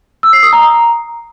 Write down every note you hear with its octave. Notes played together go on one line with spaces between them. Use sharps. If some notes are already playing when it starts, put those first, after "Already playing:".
E6
C7
D#6
A#5